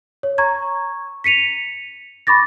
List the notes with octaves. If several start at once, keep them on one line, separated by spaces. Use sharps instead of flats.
C#5
A#5 C#6 G#6
B6 C#7 D#7 F7
B5 C#6 D6 A6 A#6